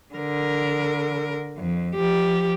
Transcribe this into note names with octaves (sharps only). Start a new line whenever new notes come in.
D3 A#4
F2
F3 G4